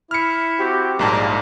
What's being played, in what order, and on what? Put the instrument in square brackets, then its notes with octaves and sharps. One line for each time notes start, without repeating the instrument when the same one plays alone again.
[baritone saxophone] E4 [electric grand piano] F6 C#7
[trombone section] C4 F#4 G4
[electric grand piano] A#1 G#2 A5 [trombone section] D#2 A#3 [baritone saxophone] G3